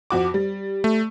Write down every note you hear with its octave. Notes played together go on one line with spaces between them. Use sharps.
F2 F#4 D6
G3
A3